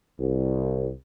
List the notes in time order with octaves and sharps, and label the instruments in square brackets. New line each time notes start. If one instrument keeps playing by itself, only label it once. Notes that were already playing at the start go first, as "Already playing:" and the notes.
[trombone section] C2